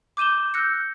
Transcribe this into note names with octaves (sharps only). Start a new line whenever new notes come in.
D6 G6 D#7 E7 G7
E6 F#6 G6 A#6 C#7